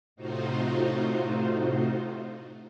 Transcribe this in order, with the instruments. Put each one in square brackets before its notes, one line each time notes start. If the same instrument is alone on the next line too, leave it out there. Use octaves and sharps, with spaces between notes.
[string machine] A2 C3 D#4 F4 F#4 C5